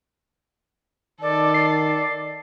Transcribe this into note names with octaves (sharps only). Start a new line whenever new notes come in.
D#3 A4 D5
D5 C7